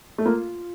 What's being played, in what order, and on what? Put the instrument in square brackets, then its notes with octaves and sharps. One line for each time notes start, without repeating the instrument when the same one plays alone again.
[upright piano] A3
[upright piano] A#3 [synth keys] F4